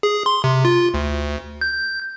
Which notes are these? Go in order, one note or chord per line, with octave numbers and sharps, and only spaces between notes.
G#4
C6
C3
F4
D2
G6